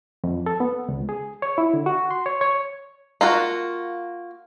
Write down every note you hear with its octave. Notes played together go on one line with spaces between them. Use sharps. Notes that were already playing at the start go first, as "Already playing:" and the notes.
F2
A4
B3
C#2
G#4
C#5
E4
D3
F#4
C6
C#5
C#5
A#3 F4 F#4